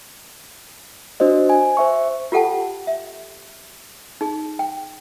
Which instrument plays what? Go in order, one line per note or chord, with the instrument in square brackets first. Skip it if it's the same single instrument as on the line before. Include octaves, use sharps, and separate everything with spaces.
[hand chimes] D4 F#4 C5 D#5
G#5
C5 E5 C#6
[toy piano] F4 G4 A4 F#5 G5 A5
E5
D#4 G#4
G5